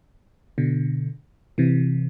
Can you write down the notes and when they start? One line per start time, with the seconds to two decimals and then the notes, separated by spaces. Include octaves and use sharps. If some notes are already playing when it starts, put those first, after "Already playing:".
0.58 B2 D3
1.58 C3 E3